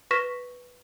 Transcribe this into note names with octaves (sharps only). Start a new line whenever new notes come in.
B4 C#6 F6 A#6 B6 E7